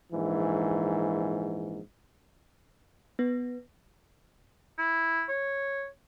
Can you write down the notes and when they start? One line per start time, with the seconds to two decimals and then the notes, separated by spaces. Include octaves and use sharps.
0.13 A#1 G#2 E3
3.19 B3
4.79 E4
5.29 C#5